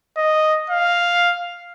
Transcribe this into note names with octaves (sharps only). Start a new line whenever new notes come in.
D#5
F5